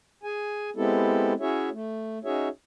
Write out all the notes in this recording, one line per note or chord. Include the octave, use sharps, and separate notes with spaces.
G#4 G#5
G#3 B3 C4 E4 G4 A4
C#4 E4 F#4 G#4 C#5 E5
A3
C#4 D#4 F#4 G#4 C#5 E5